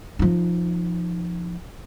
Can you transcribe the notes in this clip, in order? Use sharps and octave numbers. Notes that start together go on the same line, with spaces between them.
F3 D#4